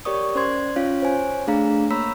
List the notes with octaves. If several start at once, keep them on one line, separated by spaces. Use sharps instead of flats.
G4 A#4 C#5 D5 C#6 D#6
C#4 C5 D5 C6 G#6
C#4 F4 C#5 F5
C5 C#5 G#5
A3 D4 G#4 F5 A#5
A#3 C#5 A#5 B5 E6 B6